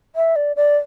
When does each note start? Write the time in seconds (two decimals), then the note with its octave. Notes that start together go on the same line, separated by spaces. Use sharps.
0.16 E5
0.36 D5
0.56 D5